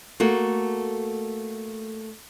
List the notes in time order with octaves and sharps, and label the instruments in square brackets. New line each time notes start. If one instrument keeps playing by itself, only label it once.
[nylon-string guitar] A3 A#3 F#4